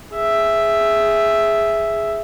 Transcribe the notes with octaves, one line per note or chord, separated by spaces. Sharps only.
G#4 E5